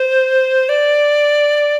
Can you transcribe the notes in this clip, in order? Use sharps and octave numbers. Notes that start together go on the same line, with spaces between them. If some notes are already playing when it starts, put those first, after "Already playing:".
Already playing: C5
D5